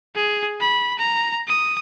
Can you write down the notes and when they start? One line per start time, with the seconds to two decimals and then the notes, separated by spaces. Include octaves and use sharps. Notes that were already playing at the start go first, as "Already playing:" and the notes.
0.15 G#4
0.61 B5
0.98 A#5
1.47 D#6